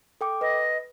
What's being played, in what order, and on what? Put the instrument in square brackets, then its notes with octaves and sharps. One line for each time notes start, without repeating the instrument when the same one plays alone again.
[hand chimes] A4 G5 D6
[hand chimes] B4 [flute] D#5